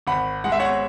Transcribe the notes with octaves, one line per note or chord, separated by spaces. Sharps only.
G#1 F#5 B5
G#3 F#5
E5
C#5 F#5